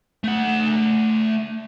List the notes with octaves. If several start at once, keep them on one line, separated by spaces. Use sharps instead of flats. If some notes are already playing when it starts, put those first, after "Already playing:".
A3 F#5